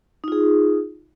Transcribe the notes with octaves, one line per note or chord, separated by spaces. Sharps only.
D#4 F4 G#4